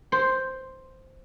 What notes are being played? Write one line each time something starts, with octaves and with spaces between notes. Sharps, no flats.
C5